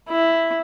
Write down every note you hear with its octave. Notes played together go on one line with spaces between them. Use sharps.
E4